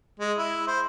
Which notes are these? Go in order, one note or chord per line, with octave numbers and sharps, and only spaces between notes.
G#3
E4
C5